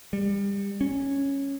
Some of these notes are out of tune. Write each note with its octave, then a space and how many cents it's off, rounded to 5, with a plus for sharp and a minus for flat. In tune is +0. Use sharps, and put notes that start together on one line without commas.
G3 +30
C#4 -5